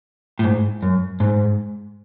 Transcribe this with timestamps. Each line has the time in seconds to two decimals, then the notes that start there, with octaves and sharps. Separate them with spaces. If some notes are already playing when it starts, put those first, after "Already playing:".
0.39 A2
0.44 G#2
0.83 F#2
1.20 G#2